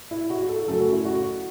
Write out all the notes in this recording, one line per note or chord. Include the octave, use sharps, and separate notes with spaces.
E4
F#4
F#4
A4
F#2 C#3 F#3 A3 A4
F#4
E4
F#4